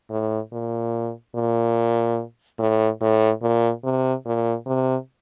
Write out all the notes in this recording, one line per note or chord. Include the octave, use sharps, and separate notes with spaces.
A2
A#2
A#2
A2
A2
A#2
C3
A#2
C3